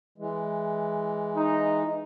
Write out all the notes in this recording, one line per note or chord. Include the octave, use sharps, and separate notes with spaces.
E3 G#3
D#4